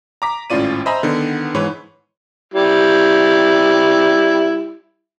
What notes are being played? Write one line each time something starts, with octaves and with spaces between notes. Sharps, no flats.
A#5 D6 B6
G#1 A2 C#4 F4 D5 D#7
C5 D#5 E5 G#5 A#5 B5
D3 D#3 B3 D#4
G#2 E3 B4 C#5
G3 E4